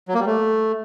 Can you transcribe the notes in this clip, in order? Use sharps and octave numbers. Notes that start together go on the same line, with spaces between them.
F#3
A#3
G3
A3